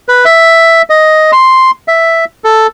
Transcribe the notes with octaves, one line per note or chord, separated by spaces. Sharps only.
B4
E5
D#5
C6
E5
A4